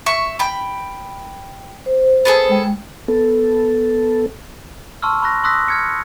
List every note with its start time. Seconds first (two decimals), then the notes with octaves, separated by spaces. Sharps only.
0.06 E5 C#6
0.39 G5 B5
1.86 C5
2.25 B3 G#4 A4
2.49 G#3 G5
3.08 B3 A4
5.02 A5 C6 C#6 E6 F6
5.22 B5 C#6 F#6 A#6
5.44 C6 D#6 E6 F#6 A#6 B6
5.68 F6 G#6 C#7